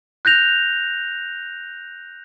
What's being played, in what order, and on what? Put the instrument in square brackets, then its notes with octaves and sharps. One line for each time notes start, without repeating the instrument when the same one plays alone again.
[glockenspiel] F#6 G6 A#6 F7